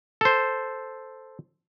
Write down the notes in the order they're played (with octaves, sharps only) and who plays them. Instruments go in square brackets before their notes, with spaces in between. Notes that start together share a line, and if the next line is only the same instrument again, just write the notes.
[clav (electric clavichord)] A4 C5